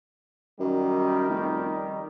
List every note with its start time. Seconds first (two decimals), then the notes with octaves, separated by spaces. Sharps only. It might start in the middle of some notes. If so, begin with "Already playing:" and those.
0.60 F#2 D#3 G3
1.29 F1